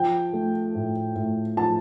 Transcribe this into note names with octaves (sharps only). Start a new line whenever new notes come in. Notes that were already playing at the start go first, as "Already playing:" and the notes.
Already playing: F3 G5
A3
A2
A2
F3 A5